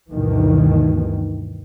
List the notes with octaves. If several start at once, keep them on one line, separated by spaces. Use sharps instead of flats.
D2 G2 B2 D#3 E3